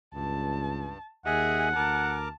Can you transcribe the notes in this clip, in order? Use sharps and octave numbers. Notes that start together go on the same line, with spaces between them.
C#2 G2 A5
D#2 G#4 D#5 E5 F#5 G#5
D2 A#4 A5 A#5 D6